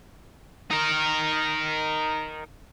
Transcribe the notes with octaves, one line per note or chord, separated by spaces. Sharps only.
D#4 A#4